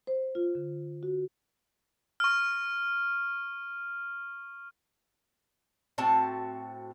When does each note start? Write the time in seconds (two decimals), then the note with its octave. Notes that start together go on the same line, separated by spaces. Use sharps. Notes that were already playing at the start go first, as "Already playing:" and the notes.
0.07 C5
0.35 F4
0.55 D3
1.03 F#4
2.20 C#6 F6
5.98 A2 C4 F#4 A5